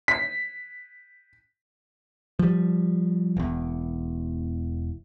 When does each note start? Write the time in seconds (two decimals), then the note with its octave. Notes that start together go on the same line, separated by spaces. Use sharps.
0.08 B6
2.39 F3 G3
3.37 E1 E2